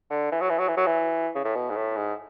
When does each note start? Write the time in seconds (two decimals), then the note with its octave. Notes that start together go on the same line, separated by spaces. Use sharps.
0.10 D3
0.32 E3
0.41 F#3
0.49 E3
0.58 F#3
0.68 E3
0.77 F#3
0.86 E3
1.35 C#3
1.44 A2
1.55 B2
1.70 G#2
1.76 A2
1.96 G#2